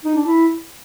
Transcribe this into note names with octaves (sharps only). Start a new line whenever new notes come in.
D#4
D4
E4